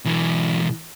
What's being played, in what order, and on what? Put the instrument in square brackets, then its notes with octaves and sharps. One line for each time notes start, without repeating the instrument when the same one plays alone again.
[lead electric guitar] B1 E3